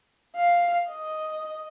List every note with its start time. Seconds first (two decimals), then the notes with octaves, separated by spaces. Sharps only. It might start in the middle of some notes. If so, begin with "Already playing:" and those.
0.36 F5
0.89 D#5